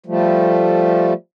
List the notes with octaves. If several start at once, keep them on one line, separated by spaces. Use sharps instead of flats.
F3 G3 A3